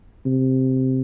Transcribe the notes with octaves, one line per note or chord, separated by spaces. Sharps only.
C3